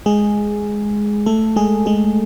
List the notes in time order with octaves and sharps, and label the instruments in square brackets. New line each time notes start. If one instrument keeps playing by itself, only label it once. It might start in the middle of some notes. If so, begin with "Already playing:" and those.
[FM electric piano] G#3 G#4
A3 A4
G#3 G#4
G#3 G#4